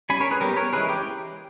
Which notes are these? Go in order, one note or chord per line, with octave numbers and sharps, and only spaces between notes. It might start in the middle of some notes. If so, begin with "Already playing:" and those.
G3 C#4 G#5 B5
A#4 C#5
G#4 B4
G3 B3 G4 A#4
A#4 C#5
E3 G#3 C#4 G#4 B4
G4